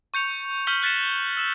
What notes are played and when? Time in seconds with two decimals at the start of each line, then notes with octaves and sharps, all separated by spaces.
0.14 C#6 G6 C#7 F7
0.67 C#6 F6 G6 B6 F#7 G7
0.83 F#6 A6 B6 C#7 E7
1.37 E6 E7